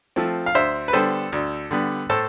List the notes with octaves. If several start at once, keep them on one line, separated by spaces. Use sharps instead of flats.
F3 A3 C4
F5
D2 C5 E5
B4
D3 G3 B3 A4 C5
D2
D3 G3 B3
A2 A4 C5